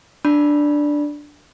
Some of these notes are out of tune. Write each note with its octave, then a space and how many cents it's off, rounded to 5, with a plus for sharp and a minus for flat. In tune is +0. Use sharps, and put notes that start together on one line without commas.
D4 +0 D5 +0 B5 -20